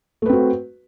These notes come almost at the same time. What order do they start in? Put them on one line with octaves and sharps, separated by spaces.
A3 B4 C4 F#4